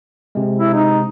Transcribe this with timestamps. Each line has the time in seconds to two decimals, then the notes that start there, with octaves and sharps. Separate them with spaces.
0.35 C3 G#3
0.59 E4
0.73 D#4